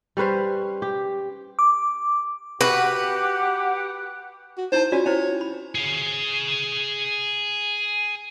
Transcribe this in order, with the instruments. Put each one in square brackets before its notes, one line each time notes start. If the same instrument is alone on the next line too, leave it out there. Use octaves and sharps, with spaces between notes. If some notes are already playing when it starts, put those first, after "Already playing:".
[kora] G3 C#4 B4 C5
G4
[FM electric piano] D6
[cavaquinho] F#4 E5 [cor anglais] G4 [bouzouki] B4 [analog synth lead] F#5
[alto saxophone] F#4
[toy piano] D#4 E4 A5 [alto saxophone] C5
[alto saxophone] C#4 [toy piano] F4 F#4 D5
[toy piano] C#4 E4 C5 [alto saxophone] C#5
[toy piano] B5
[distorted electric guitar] G#4 F5